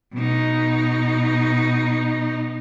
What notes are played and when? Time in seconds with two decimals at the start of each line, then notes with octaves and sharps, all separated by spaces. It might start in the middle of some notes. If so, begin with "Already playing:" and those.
0.13 B2 D#4